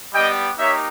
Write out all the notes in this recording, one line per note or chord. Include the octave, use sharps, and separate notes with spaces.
G3 B3 G4 D#5 G5
A#3 D#4 G4 C#5 E5